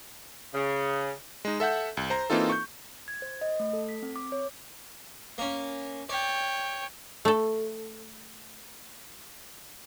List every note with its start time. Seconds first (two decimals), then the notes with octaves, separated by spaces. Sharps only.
0.54 C#3
1.45 G#3 D#4
1.60 A4 E5 F#5 G6
1.97 C2
2.10 C5 A#5
2.30 E3 A#3 C4 D#4 F4 A4
2.49 C#6 G6
3.08 G#6
3.22 C5
3.41 D#5
3.60 A3
3.73 A4
3.89 B6
4.02 C4
4.16 D6
4.32 C#5
5.38 A#3 C#4
6.09 C#5 D5 G5
7.25 A3 A4